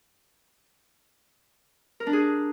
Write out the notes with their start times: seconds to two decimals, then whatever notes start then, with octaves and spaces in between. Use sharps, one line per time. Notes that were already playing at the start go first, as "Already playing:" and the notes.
2.00 A#4
2.07 D4
2.13 G#4